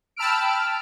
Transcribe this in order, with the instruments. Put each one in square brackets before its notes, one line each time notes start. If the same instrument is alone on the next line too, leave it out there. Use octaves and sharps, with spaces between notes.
[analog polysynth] G5 A5 B5 E6 F6 D7